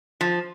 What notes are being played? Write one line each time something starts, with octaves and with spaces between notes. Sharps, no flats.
F3